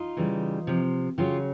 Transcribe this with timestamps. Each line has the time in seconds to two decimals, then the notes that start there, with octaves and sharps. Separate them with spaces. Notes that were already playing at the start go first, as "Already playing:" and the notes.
Already playing: D#4 F4
0.17 C#3 E3 G3
0.67 C3 F3
1.18 C#3 F#3 F4 G4